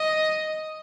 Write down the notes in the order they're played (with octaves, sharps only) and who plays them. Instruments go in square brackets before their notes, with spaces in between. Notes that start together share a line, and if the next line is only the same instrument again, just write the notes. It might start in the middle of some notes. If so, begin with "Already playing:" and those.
Already playing: [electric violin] D#5